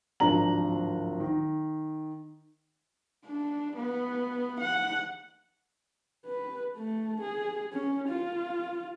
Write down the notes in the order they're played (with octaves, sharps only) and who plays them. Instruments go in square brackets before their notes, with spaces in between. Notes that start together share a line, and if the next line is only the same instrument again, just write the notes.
[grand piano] D1 G#1 F3 D4 A#5 F#7
D#3
[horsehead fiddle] D4
B3
F#5
B4
A3
G#4
C#4
F4